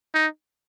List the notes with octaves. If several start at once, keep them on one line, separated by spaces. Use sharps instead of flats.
D#4